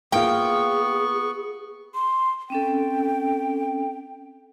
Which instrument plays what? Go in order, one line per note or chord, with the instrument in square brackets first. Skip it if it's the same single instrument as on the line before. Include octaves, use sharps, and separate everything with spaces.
[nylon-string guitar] A#3 F4 [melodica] B3 C#6 [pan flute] G#4 [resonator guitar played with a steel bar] G5
[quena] C6
[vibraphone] C4 C#4 A4 [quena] G5